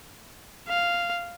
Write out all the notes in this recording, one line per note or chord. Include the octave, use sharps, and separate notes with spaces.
F5